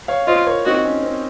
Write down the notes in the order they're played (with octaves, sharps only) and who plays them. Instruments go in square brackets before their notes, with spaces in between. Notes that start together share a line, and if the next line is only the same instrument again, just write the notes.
[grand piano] C#5 F5
[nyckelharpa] F4 [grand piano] C5 D#5
[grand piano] A#4 C#5
[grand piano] C4 D#4 [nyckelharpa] F#4
[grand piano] C#4
C4